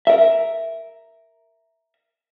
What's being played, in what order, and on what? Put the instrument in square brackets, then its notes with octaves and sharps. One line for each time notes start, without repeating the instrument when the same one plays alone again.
[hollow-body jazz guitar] A#4 E5